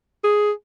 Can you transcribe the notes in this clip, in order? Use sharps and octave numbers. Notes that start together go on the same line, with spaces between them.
G#4